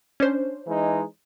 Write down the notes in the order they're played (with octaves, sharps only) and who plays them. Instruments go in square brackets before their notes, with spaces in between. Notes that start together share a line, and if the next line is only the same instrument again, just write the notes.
[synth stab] C#4 D4 C5
[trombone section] E3 G#3 D#4